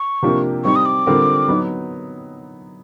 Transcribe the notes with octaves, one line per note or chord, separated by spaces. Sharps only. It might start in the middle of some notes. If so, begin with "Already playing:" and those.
Already playing: C#6
C3 F3 A#3 D4 G4
G3 C4 D#4 G4 C#6
D#6
D6
D3 G3 C4 F4 A#4
F#3 B3 D#4